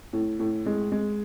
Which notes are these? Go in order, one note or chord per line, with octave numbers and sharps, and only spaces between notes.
A2
A2
G#3
G#3